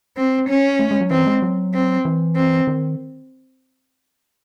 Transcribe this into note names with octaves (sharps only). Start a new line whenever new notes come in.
C4
C#4
A3
G#3
F#3
E3 C4
G#3
F#3
C4
E3
C4
D#3